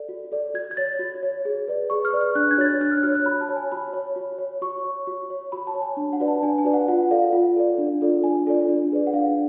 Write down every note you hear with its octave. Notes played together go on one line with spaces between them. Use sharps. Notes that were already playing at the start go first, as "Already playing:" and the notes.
Already playing: A4 D5
F#4
A4 D5
F#4 G#6
G#6
C#5 A6
F#4
C#5
G#4
B4 D5
G#4 C#6
F6
B4 D5
F6
D4 F#6
G#6
F#4 C#5 A6
G#6
D4 F#6
F6
F#4 C#5 F6
F#6
F#4 B5
A5
C#5
G#5
F#4 B5
C#5
F#4
C#5
F#4 C#6
C#5
F#4
C#5
F#4 B5
A5
C#5
G#5
D4
F#5
F#4 B4 D5
A5
D4 G#5
G#5
F#4 B4 D5
F#5
F4 F#5
A4 D5 F5
F4 F#5
A4 D5
D4
F4 A4 D5
D4 G#5
F4 A4 D5
D4
G#4 B4 D5
F#5
D4 F5